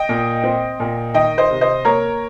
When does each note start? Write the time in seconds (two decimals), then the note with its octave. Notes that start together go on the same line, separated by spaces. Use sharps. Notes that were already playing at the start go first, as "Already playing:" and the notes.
Already playing: D#5 G5
0.09 A#2
0.44 C4
0.80 A#2
1.14 D#3 D#5 G5
1.38 C5 D#5
1.50 C3
1.61 C5 D#5
1.85 A#3 A#4 C#5